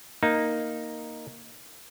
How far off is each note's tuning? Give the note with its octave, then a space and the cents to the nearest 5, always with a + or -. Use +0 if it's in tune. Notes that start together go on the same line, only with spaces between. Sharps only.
A#3 +0 D#4 +0